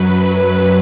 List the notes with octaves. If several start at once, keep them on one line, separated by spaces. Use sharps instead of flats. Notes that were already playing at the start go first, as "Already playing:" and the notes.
Already playing: F#2 F#3 B4
B4